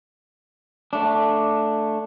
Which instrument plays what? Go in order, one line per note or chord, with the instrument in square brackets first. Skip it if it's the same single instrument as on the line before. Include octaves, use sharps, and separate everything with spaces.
[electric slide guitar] A3 D4